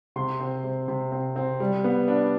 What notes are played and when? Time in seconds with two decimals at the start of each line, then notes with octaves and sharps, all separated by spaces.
0.16 C3 C6
0.40 C4
0.64 C3
0.88 C3
1.12 C4
1.36 C4
1.60 G3
1.84 B3
2.08 D4